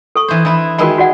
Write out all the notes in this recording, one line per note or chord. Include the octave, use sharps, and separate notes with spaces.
A4 C#6
E3 C5
E3 E4
D#3 G#3 F#4 A#4 B5
F#4 D5 F#5